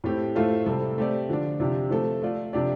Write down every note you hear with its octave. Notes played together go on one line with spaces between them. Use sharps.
A2 A3 C4 G4
A2 A3 F4 A4 C5
C3 G3 C4 A4
A3 C4 G4 D5
D3 F3 D4
C3 F3 D4 G4
F3 A3 C4 A4
A3 F4 D5
C3 F3 D4 G4 D5